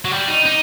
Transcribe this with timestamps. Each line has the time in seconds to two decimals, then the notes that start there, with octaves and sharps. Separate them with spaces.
0.05 F#3
0.12 G3
0.28 D#4
0.45 D#4